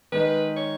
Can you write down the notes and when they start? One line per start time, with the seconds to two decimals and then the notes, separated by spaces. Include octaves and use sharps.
0.12 D#3 G#3 D#4 B4
0.56 C#5